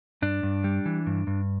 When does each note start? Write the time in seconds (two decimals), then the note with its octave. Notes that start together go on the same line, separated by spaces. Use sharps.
0.22 G2 D4
0.43 G2
0.64 G3
0.86 E3
1.07 G2
1.27 G2